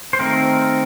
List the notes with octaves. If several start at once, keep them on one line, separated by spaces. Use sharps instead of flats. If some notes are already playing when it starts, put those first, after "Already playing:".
C5
D#3 A3 C4 A#4